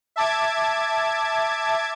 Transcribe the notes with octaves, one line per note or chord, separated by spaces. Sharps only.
E5 A5 D6 G#6